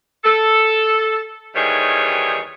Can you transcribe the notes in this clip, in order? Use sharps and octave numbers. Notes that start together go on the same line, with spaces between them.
A4
D#2 D#3 E3 G3 G#4 C#5